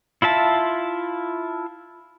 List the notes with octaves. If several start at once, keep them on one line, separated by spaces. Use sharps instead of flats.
E4 F4 E5 A5